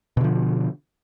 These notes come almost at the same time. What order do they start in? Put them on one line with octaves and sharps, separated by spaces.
B2 D3 F3